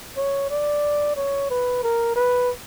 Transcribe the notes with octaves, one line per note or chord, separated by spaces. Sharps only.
C#5
D5
C#5
B4
A#4
B4